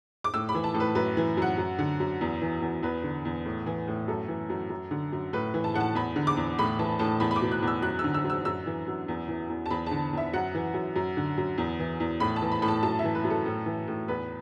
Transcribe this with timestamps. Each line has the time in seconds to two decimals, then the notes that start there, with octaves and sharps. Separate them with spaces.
0.24 D6
0.34 A2 E6
0.49 B5
0.55 E3
0.64 A5
0.74 A2
0.80 B4
0.95 F#2 B4
1.17 E3
1.37 F#2 F#5
1.58 F#2
1.79 D3
2.00 F#2
2.21 E2
2.41 E3
2.62 E2
2.83 E2 B4
3.03 D3
3.25 E2
3.45 A2
3.66 E3
3.87 A2
4.08 F#2 A4
4.28 E3
4.50 F#2
4.70 F#2
4.91 D3
5.12 F#2
5.33 A2 B4
5.54 E3
5.64 A5
5.74 A2 F#5
5.81 A5
5.95 E2 B5
6.16 D3
6.27 D6
6.37 E2
6.58 A2 B5
6.79 E3 A5
6.99 A2 A5
7.20 E2 B5
7.31 B5
7.36 D6
7.42 B2
7.52 F#6
7.62 E2
7.67 E6
7.82 F#2 F#6
7.99 E6
8.04 D3
8.14 E6
8.24 F#2
8.30 E6
8.45 F#2 E6
8.66 E3
8.88 F#2
9.08 E2
9.28 E3
9.50 E2
9.66 A5
9.70 E2 B5
9.86 D3 A5
10.13 E2 E5
10.33 F#2 F#5
10.55 E3
10.74 F#2
10.96 F#2
11.17 D3
11.38 F#2
11.58 E2
11.80 E3
12.00 E2
12.20 A2 B5
12.36 A5
12.42 E3
12.52 B5
12.62 A2 B5
12.68 A5
12.83 F#2 A5
12.99 E5
13.04 E3
13.15 B4
13.25 F#2
13.30 A4
13.46 A2
13.66 E3
13.88 A2
14.08 E2 B4